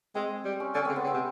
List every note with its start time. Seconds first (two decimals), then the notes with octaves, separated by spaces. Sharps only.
0.15 G#3 C4
0.45 G3
0.60 C#4
0.75 D3 C#4
0.85 C#3 C4
0.96 B3
1.04 C#3
1.07 C4
1.14 C3